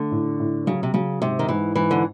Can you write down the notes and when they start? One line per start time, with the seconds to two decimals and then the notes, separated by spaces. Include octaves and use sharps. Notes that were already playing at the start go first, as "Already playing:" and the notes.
Already playing: D3 A3
0.11 A2
0.40 A2
0.67 C#3 F#3
0.83 C3
0.94 C#3 F#3
1.22 G#2 C3
1.39 D#3
1.49 G#2 E3
1.75 G#2 E3
1.91 D3